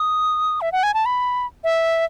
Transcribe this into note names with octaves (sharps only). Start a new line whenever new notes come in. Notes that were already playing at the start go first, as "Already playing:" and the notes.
Already playing: D#6
E5
F#5
G#5
A5
B5
E5